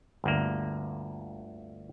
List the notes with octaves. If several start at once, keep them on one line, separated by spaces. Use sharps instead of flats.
G1 D2 A#3